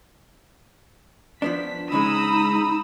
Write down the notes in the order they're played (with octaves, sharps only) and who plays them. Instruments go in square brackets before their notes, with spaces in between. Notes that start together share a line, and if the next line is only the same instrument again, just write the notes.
[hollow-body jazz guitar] F3 B3 D4 [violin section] B6
[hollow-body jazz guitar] C#2 C#3 G#3 [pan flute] D#4 [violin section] A#5 D#6 E6 [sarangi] B5